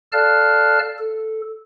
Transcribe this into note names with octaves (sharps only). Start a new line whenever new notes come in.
A4 D5 F5 A5 F6 F#6
A4